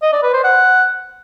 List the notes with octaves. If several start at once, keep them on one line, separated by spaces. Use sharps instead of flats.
D#5
D5
B4
C5
F#5